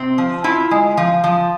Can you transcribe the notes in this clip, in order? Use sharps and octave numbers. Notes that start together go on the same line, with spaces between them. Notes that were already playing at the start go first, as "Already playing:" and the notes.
Already playing: C3 C4
F3
E4 F4
G#3
F3
F3